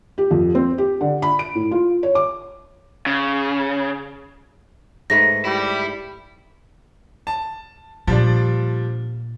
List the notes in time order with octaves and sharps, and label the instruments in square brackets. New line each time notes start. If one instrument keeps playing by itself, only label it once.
[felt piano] G4
F2
C4
G4
D3
B5
D7
A2
F4
C#5
D6
[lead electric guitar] C#3
[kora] G#2 A3 B4 [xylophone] A#6
[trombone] G3 [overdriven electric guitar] E4
[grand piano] A5
[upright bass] A#2 [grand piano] F3 G3 D4